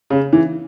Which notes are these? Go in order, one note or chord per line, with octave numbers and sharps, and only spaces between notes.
C#3
E3